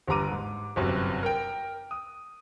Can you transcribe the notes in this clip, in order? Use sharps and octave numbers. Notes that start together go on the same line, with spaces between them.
G1 D3 G3 A#5 D6 D#7
G#2
G1 F#2 C3
A#4 G5
D#6